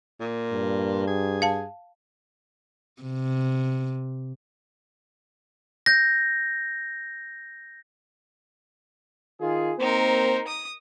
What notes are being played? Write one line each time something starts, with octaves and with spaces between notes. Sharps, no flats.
A#2
G2
G#4
F5 A5
C3
G6 A#6
D#3 F4 G#4
A#3 C4 D#4 A#4 C5
D#6